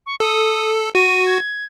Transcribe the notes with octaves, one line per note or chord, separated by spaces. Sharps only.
C#6
A4 D#6
F#4 D#7
G#6